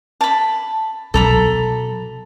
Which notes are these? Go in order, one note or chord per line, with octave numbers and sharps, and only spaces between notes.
A5 B5
B2 F#3 A4 A#5 B5